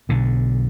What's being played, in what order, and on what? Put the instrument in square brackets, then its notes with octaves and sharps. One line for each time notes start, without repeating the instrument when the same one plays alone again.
[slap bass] B1 B2 D3